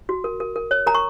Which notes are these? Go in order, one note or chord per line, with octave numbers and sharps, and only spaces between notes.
F#4
A#4
A#4
A#4
C#5
A#4 A#5
C#6